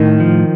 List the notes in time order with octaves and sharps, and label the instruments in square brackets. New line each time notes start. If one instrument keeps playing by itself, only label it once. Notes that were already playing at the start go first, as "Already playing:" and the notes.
Already playing: [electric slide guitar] A2 [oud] D#3
[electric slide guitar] F3